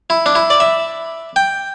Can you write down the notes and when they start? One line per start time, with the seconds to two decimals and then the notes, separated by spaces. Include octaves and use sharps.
0.10 E4
0.26 D4
0.35 E4
0.50 D5
0.60 E5
1.36 G5